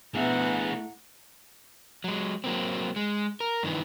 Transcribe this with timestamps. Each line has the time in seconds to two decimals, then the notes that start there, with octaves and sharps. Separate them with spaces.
0.15 A2 B3 D4 G#4 E5 F#5 A#5
2.04 F#3 G#3
2.44 F#3 A#3 C4
2.96 G#3
3.40 A#4
3.63 G2 D#3 E3